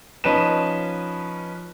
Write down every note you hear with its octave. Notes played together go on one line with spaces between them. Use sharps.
F3 C#4 D#4 B4 E7